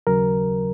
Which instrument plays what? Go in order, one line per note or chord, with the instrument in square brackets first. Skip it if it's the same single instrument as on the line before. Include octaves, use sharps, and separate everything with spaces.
[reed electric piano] D#2 C#3 F#3 A#4